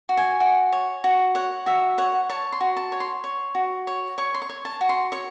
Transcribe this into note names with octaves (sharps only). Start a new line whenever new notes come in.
F#4
G#5
F#4
C#5
F#4
C#5 F#5
F#4 E5
C#5 F#5
C#5 A5
C6
F#4
A5
C#5
C6
C#5
F#4
C#5
C#5 C#6
C6
C#6
C#5
A5
F#4
C6
C#5 C#6